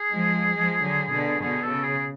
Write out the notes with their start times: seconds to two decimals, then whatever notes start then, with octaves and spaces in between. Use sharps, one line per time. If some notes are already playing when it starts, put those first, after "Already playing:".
Already playing: G#4
0.13 F3 G#3
0.55 F3 G#3
0.84 D3 F#3
1.12 B2 D3
1.41 B2 D3 G#4
1.63 A4
1.70 C#3
1.84 G#4